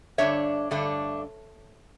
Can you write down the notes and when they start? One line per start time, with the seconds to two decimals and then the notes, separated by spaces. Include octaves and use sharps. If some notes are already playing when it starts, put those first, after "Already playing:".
0.18 G2 D3 A3 D4 C#5 E5
0.71 G2 D3 A3 D4